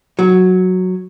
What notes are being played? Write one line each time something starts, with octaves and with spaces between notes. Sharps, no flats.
F#3